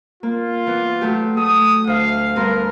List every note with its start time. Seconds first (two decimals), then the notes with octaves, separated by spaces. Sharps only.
0.23 A#3 F4
0.67 E3 B3
1.01 F#3 A3 G4
1.37 A3 D#6
1.87 D2 E5 F5
2.36 G2 B3 A#4 C6